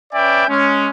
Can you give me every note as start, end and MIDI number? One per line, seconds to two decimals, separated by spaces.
0.14 0.44 61
0.14 0.44 71
0.14 0.44 74
0.14 0.44 76
0.14 0.44 79
0.48 0.90 56
0.48 0.90 61